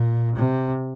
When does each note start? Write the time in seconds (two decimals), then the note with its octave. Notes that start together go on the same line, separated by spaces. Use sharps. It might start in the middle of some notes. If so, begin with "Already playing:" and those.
Already playing: A#2
0.36 C3